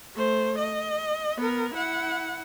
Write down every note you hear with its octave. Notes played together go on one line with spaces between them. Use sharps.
A3 C5
D#5
B3 A#4
E4 F#5